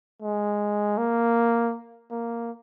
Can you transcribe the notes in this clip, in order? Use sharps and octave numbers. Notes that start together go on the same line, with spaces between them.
G#3
A#3
A#3